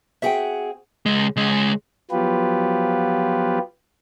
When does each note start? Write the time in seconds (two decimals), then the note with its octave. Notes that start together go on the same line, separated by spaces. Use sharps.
0.22 C4 F#4 G#4 E5 G5
1.06 C#2 G#3
1.36 C#2 G#3
2.11 F3 F#3 B3 F4 G4 B4